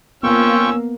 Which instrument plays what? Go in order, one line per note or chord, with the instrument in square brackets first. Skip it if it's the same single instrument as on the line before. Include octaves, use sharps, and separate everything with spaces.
[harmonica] F3 C#4 E6 [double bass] A#3 [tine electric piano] B3 [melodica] F4 G5 C#6